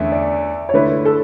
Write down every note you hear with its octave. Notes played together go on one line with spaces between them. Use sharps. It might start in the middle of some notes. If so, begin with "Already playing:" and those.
Already playing: E2 D3 A3 C#4 E5
D5
C#5
D3 A3 E4 B4
A4